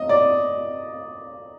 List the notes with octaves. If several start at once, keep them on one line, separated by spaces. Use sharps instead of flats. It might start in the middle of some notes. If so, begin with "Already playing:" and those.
Already playing: D#5
D5